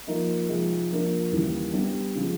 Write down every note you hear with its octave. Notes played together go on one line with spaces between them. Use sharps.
F3 A#3 D#4
C3 F3 G#3 C4 D#4
F3 A#3 D4
D#2 C#3 E3 G3
G3 B3 D4 G4
C#3 F3 G#3